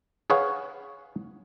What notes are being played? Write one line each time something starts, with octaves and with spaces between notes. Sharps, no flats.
G#4 B4 C#5 F5 F#5